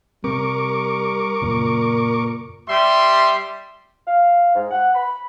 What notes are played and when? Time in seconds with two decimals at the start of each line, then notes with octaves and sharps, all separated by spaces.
0.24 C3 G3 C4 A#4 C#6 D6
1.42 F#2 A#2 C#3
2.68 G3 E5 C6
4.07 F5
4.55 G#2
4.71 F#5
4.95 B5